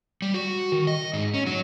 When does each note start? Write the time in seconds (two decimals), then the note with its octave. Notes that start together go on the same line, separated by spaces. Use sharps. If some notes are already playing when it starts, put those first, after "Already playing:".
0.22 G3
0.34 F#4
0.72 D#3
0.87 D#5
1.13 G#2
1.34 C#4
1.46 F#3